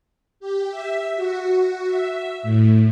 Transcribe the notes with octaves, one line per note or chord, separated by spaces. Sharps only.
G4
E5
F#4
E5
A2